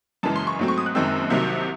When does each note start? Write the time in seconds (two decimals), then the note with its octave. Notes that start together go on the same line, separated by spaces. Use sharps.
0.23 F#2 C#3 E3 G#3 A5
0.36 C6
0.47 C#6
0.59 G#2 F#3 A3 C4
0.68 C#6
0.78 D#6
0.86 F#6
0.95 F#1 F#2 D#3 G#3 C4 E6
1.30 C2 C3 D#3 F#3